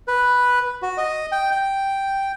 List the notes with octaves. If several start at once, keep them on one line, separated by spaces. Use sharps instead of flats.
B4
F#4
D#5
G5
G5